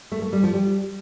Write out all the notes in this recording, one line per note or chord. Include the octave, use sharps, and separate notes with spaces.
A3
A3
G3
F3
G3